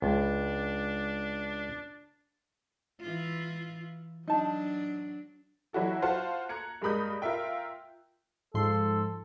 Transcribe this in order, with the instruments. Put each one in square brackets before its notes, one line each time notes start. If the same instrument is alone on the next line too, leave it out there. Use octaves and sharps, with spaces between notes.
[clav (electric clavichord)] C#2 [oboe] D4
[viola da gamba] E3 E4 F4
[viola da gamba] F#3 D4 [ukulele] D#4 A5
[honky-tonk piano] E3 F#3 E4 F#4 A4
F4 F#4 C5 F#5 A5
A#5 F#6 G#6 C#7
G2 G#3 A#4 B5 D#6 G6
F4 A#4 E5 G5
[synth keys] G#2 F3 C6 [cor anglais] A4